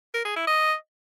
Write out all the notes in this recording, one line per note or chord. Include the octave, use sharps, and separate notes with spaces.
A#4
G#4
E4
D#5